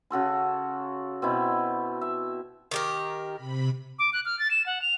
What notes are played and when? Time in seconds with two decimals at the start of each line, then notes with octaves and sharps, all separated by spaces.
0.11 C#3 F#4 A4 C6
1.22 B2 C4 E4
2.01 E5
2.71 D#3 G4 A#4
3.35 C3 B5
3.99 D6
4.13 F#6
4.25 F6
4.39 A6
4.51 E7
4.66 F#5
4.82 F7